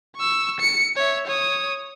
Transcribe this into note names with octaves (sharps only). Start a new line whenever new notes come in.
C#6 E6
C#7
C#5 E5
C#5 D#6